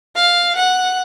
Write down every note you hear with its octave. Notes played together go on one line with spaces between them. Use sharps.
F5
F#5